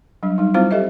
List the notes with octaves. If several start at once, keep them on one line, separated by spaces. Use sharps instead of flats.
F#3 G3 D4
G3 D#4
G3 C4 E4 F4 C5 F5
G4 A4 C5 D#5 E5